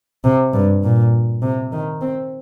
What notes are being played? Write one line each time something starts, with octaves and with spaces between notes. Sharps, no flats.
C3
G2
A#2
C3
D#3
C4